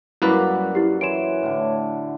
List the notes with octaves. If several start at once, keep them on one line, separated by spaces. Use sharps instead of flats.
F#2 G3 A#3 E4 F#4 B4 D5 F#5
E4 G4
E3 C#5 C6 D7 E7
A2 D3